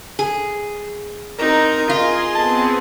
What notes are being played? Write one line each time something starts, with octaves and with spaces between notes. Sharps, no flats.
G#4
C4 D#4 A#4
F4 G#4 D#5 G#5 C6
B3 C4 G#4 A5